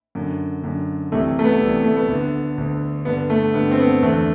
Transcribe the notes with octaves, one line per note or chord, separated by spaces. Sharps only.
F#2 D3
F#2 D3
C2 C3 E3 A3
A3
B3
C2 C3 E3
A3
B3
D2 D3
D2 D3
G2 D3 B3
A3
G2 D3 B3
C4
B3
E2 D3 A3